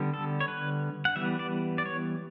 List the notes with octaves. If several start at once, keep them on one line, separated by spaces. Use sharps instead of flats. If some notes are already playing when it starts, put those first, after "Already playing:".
Already playing: D3 G3 B3
A4
C#5
B4
F#5
E3 G3 B3 E5
D5
D5
C#5